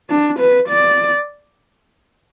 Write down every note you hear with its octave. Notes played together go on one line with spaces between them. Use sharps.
D4
B4
D5